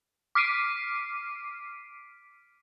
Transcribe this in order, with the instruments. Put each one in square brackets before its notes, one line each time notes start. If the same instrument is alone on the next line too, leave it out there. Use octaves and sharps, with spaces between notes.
[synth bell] D6 F6 B6 C7 D7 D#7